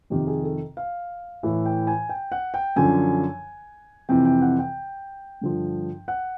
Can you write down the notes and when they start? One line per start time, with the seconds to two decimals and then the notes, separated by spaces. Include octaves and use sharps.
0.10 F2 C3 D#3 G4
0.27 G#4
0.43 A4
0.77 F5
1.43 A2 E3 E5
1.65 G5
1.87 G#5
2.09 G5
2.32 F#5
2.54 G5
2.76 F#2 D3 F3 G#5
4.09 F2 C3 E3 G5
4.25 G5
4.42 F#5
4.59 G5
5.41 G2 D3 F3
6.08 F#5